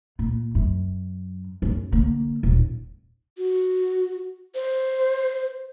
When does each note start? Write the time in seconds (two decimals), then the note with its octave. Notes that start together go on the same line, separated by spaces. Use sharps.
0.19 A#2
0.55 F#2
1.62 F#2
1.92 D3 A#3
2.43 D#1
3.38 F#4
4.55 C5